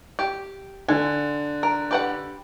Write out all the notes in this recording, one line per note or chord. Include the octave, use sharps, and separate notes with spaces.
G4
D3 G#5
A#4
G4 B4 F#5